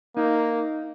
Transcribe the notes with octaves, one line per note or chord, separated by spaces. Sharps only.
A#3 D#4